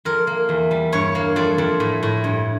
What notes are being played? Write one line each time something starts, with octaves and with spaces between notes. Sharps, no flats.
F2 A#4
A#3
E2
G3
G2 C#5
A#3
F2 D5
F2
A2
A2
G2